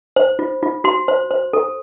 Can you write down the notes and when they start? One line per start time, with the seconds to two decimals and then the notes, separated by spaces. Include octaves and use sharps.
0.16 C5
0.39 F4
0.63 F4
0.84 F#4 C6
1.08 C5
1.31 C5
1.53 A4